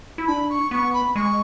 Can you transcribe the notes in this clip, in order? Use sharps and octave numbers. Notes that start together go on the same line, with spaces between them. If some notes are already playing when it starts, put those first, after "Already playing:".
E4
D4 B5
C#6
B3 C#6
B5
G#3 C#6